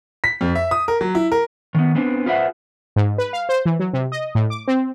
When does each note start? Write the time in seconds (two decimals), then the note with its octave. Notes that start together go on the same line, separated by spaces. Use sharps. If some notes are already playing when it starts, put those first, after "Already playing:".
0.24 B6
0.41 F2
0.55 E5
0.71 D#6
0.88 A#4
1.01 F#3
1.15 E4
1.32 A#4
1.75 D#3 B3
1.95 B3 C4 D4 B4
2.26 F4 G#4 B4 C5 E5 F#5
2.96 G#2
3.18 B4
3.33 F5
3.49 C5
3.66 E3
3.80 F#3
3.93 C3
4.12 D#5
4.35 A2
4.50 D6
4.68 C4